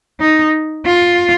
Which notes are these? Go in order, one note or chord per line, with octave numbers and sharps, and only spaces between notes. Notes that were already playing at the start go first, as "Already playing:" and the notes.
D#4
F4